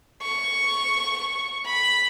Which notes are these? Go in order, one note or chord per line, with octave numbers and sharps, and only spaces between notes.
C#6
B5